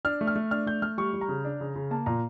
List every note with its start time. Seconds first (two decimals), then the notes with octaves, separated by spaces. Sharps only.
0.05 D4 F6
0.21 A3
0.27 F6
0.36 A3
0.51 D4 F6
0.67 A3 G6
0.82 A3 F6
0.98 G3 C#6
1.13 G3
1.21 A#5
1.29 C#3
1.45 D4
1.60 C#3
1.75 C#3
1.91 A#3 A5
2.06 A#2 A#5